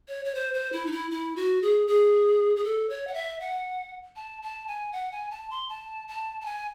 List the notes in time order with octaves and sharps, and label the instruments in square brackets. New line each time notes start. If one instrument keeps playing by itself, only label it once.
[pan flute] C#5
C#5
C5
C5
E4
D#4
E4
E4
F#4
G#4
G#4
G#4
A4
C#5
F#5
E5
F#5
A5
A5
G#5
F#5
G#5
A5
C6
A5
A5
A5
G#5